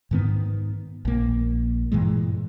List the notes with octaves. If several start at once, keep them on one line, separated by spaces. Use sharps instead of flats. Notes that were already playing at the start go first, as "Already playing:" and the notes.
G#2 D#3 B3
A#1 A#3
G2 A#2 E3 G#3